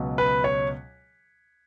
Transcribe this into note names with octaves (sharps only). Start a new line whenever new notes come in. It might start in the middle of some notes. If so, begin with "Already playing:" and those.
Already playing: C#2 B2 F#3
B4
C#5